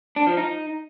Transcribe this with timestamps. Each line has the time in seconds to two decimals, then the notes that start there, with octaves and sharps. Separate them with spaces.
0.16 D4
0.27 F3
0.37 D#4